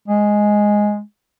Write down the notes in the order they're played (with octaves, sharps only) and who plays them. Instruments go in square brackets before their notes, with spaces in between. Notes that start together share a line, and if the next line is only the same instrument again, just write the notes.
[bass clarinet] G#3